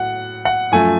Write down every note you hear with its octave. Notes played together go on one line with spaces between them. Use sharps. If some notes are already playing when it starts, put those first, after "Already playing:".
Already playing: A2 F#3 F#5
F#5
F#2 F3 A3 G#5